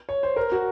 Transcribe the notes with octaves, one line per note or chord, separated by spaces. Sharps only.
C#5
C5
A#4
F#4